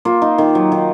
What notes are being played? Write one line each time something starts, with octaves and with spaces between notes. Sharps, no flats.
A#3 F4
D#4
D#3
F#3
D#3